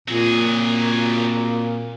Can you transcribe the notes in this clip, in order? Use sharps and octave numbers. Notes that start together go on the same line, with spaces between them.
A#2 F#3 C4 F4 G#4